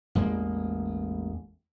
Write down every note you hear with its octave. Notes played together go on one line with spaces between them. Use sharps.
A1 E2 G#3 A#3